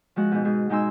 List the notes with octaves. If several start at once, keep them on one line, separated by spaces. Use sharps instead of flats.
F3 G#3 F#4
G#2 B2
G#2 G#4
B2 G#3 D#4 G#5 C6 E6